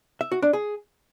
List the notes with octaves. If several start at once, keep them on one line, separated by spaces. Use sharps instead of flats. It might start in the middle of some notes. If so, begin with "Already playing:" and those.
E5
F#4
D4
G#4